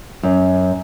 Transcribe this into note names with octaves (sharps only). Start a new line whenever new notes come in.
F#2